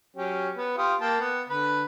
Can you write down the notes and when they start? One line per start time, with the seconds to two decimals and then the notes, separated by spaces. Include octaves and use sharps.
0.16 F#3 C#4 G4
0.57 B3 B4
0.78 F4 G4 D#6
1.00 A#3 G5 A5
1.20 B3
1.49 D3 B4 B5